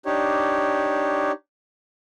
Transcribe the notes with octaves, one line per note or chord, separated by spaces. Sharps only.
D4 D#4 G4 C#5